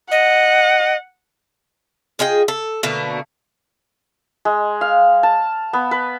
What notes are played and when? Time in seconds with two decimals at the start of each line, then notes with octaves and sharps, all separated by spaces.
0.11 D#5 F#5
2.19 F4 G#4 D#5 G5
2.48 A4
2.83 B2 D3 A3 A#3
4.45 G#3
4.81 F5
5.23 A5
5.73 B3
5.91 B4